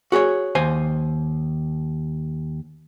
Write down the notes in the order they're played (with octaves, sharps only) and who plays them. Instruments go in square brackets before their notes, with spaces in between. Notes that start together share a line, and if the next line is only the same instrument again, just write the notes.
[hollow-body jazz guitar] F#4 G#4 A#4 C#5
D#2 C5 G#5